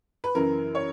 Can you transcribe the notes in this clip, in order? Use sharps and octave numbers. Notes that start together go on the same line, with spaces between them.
B4
F#2 C#3 E3 A#4
C#5